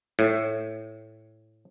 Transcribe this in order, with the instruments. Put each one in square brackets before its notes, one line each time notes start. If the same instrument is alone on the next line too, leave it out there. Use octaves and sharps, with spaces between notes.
[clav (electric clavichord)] A2